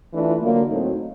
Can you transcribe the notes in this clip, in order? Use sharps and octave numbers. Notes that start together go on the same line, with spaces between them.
E3 A3 D4 F4
D3 F#3 A#3
A2 F#3 A3 C4 D#4